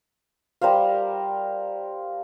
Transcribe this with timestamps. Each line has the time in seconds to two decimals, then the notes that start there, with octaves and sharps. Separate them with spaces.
0.61 G3 A#4 C5 F5